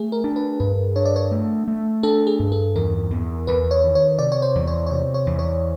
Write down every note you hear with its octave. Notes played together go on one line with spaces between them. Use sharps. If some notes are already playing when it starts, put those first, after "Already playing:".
Already playing: A3 G#4
A#4
D4
B4
G2 B4
D4 C#5
D5
C#5
A3
A3
D4 A4
G#4
G2
A4
E2 A#4
E2
E2 B4
C#5
D#3
C#5
C3 D5
C#5
C5
E2
C#5
C#5
C3 D5
C#5
E2
C#5